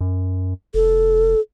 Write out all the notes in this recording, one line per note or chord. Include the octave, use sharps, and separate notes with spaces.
F#2
F1 A4